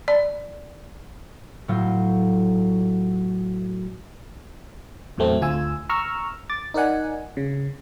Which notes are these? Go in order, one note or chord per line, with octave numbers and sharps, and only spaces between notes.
D5
A2 F#3 F4
E2 A2 F#3 A3 C4
D2 F4 G#5 E6
A#5 C#6 E6 F6
D6 A6
D#4 A#4 D5 F#5 G#5
C#3